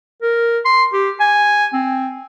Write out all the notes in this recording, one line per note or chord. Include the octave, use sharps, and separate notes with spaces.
A#4
C6
G4
G#5
C4